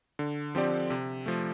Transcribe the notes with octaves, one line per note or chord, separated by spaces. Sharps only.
D3
F3 C4 G4 D5
C3
F3 A3